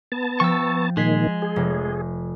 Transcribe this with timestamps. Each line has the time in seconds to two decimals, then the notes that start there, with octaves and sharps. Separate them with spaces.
0.12 B3 A5
0.40 F3 G5 C#6 E6 A6
0.97 A#2 D#3 G#3 G#6 B6 C7
1.42 G#4
1.56 F1